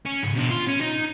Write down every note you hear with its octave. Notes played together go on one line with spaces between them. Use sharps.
C#4
C#2 G#2
B2 D4
F4
C#4
D#4